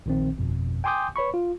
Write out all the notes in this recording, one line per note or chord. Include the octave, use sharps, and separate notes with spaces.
A#1 D#3 C4
G1 F2 B2
G5 G#5 C6 D6 D#6 G6
B4 C#5 B5 C#6
F4